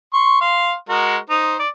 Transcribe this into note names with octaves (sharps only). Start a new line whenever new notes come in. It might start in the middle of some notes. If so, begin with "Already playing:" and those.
C6 C#6
F5 C6
G#3 F#4 A#4
D#4 C5
D5